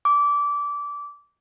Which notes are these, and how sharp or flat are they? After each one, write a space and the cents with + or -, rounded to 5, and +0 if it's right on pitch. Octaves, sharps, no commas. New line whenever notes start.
D6 -20